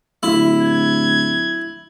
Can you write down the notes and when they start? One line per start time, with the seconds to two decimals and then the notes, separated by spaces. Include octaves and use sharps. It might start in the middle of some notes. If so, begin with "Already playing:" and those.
0.23 D1 E4
0.62 G#6